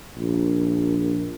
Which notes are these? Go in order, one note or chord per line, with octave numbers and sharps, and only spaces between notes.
A#1